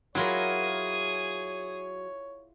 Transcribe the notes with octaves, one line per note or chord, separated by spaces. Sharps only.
F#3 E4 F4 G#4 A#4 C#5 G#5